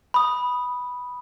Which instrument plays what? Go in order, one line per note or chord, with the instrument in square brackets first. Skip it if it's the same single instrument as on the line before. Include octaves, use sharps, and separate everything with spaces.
[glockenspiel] B5 D#6